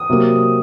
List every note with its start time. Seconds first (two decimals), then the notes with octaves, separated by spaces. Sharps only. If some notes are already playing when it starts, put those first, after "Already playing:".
Already playing: D#6
0.10 C3 F#3 A#3